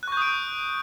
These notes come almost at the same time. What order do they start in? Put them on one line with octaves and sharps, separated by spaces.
F#6 C#6 G6 D#6 D7